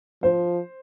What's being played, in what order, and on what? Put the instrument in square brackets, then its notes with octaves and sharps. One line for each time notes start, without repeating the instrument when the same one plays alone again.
[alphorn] F3 [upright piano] C5